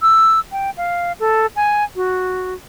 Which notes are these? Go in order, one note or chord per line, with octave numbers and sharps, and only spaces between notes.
E6
G5
F5
A4
G#5
F#4